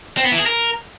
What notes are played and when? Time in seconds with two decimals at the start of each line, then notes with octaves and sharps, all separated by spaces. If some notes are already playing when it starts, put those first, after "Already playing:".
0.17 C4
0.25 B3
0.32 E3
0.39 G#4
0.46 A#4